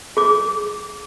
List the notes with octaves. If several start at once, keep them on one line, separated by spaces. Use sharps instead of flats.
G#4 D6